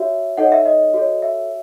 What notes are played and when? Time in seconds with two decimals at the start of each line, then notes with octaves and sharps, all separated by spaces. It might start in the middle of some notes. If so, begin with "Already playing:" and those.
Already playing: F#4 C#5 E5
0.37 D#4 A4 C#5 D#5 F#5
0.52 E5
0.66 D#5
0.94 F#4 A4 C#5
1.22 E5